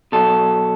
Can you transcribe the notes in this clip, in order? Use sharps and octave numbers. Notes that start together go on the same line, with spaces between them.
B2 F#3 A4